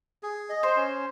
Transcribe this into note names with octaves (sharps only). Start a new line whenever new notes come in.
G#4
D#5
C5
C#4